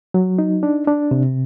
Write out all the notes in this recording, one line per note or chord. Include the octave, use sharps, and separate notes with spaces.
F#3
D#4
D4
D4
C3